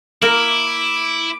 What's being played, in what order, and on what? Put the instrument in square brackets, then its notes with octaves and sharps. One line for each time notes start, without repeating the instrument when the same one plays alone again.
[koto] A#3 A#4 [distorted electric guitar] E4 [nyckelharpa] D6